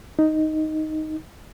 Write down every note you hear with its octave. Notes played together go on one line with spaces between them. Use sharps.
D#4